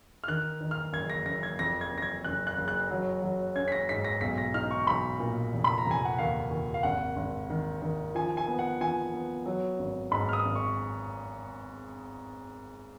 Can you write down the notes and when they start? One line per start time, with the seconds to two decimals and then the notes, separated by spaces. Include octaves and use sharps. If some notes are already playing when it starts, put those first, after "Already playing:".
0.24 F6
0.28 D#3 F#6
0.61 D#3
0.71 F6
0.93 F#1 G#6
1.10 A#6
1.26 F#1 A#6
1.43 G#6
1.59 F2 A#6
1.81 G#6
1.92 F#1
1.98 A#6
2.02 G#6
2.25 F#1 F#6
2.47 F#6
2.58 F#1
2.68 F#6
2.91 F#3
3.22 F#3
3.56 C#4 G#6
3.68 B6
3.72 A#6
3.89 G#2 B6
4.05 A#6
4.21 B1 B6
4.38 A#6
4.54 D#4 F6
4.71 C#6
4.87 B1 B5
5.19 A#2
5.53 F1
5.64 B5
5.78 A#5
5.85 F1
5.91 G#5
6.05 F#5
6.18 D#2 F5
6.51 D#2
6.74 F5
6.83 G#1 F#5
7.16 G#1
7.50 D#3
7.82 D#3
8.15 F3 G#5
8.37 G#5
8.48 B3
8.59 F#5
8.81 F3 G#5
9.13 B3
9.46 F#3
9.79 G#1
10.11 G#2 B5
10.29 F6
10.33 D#6
10.45 G#1
10.55 C#6